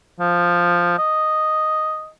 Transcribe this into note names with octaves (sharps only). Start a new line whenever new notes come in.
F3
D#5